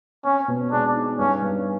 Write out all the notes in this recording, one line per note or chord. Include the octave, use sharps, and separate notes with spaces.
C4 C#4
B2
G#3 D4
D#4
G2 C#4
G2